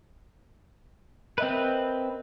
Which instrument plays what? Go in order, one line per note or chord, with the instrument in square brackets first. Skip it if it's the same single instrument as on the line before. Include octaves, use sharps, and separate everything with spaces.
[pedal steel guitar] C4 B4 [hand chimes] A#4 D#5 E5